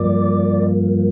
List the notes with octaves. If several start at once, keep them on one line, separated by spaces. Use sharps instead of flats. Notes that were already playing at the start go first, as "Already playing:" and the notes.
Already playing: G2 F3 A#3 D5